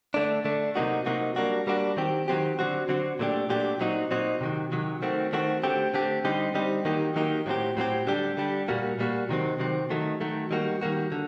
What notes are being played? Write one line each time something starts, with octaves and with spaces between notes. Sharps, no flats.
D3 A3 D4
D3 A3 D4
C3 F#3 A#3 D#4 F#4
C3 F#3 A#3 D#4 F#4
G3 A#3 D4 F#4
G3 A#3 D4 F#4
D#3 F#3 C4 G4
D#3 F#3 C4 G4
D3 F#3 C4 F#4
D3 F#3 C4 F#4
A#2 F#3 A3 D4 G4
A#2 F#3 A3 D4 G4
A#2 F#3 C4 D#4 F#4
A#2 F#3 C4 D#4 F#4
C3 D#3 F#3
C3 D#3 F#3
D#3 A3 C4 F#4
D#3 A3 C4 F#4
D3 A3 C4 G4
D3 A3 C4 G4
D3 G3 C4 D#4 G4
D3 G3 C4 D#4 G4
D#3 F#3 A#3 D#4 G4
D#3 F#3 A#3 D#4 G4
A2 F#3 C4 G4
A2 F#3 C4 G4
D3 G3 D4 G4
D3 G3 D4 G4
A#2 G3 A#3 F#4
A#2 G3 A#3 F#4
C3 D#3 F#3 C4
C3 D#3 F#3 C4
D#3 F#3 A3
D#3 F#3 A3
D#3 G3 A#3 F#4
D#3 G3 A#3 F#4
D3